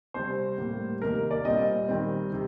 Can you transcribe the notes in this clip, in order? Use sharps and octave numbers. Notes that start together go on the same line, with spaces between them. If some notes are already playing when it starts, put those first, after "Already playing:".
C3 G3 C4 C5
A2 G3 A#3
C3 D#3 A#3 A#4
D5
A#2 G3 C4 D#5
D#3 G3 C4
C3